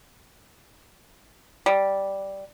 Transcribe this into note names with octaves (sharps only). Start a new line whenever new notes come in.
G3